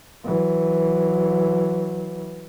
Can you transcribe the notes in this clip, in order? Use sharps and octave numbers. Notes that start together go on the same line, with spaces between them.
E3 F#3